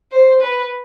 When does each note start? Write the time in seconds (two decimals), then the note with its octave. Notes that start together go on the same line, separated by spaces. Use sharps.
0.12 C5
0.41 B4